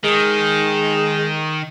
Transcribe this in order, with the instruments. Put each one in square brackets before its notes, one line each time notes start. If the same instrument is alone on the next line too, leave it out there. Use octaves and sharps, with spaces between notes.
[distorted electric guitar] D#3 [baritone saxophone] G#3